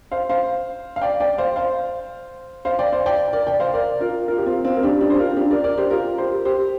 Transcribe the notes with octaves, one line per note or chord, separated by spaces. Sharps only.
C5 F5
C5 F5
F5
D5 G5
D5 G5
C5 F5
C5 F5
C5 F5
D5 G5
C5 F5
D5 G5
A#4 D5
D5 G5
C5 F5
A#4 D5
F4 A#4
F4 A#4
G4
C4 F4
C4 F4
A#4
D4 G4
D4 G4
C5
F4 A#4
D4 G4
A#4 D5
A#4 D5
G4 C5
F4 A#4
G4 C5
G4 C5